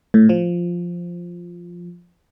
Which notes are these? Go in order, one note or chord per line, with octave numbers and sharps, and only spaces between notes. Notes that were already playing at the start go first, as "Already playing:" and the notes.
A2
F3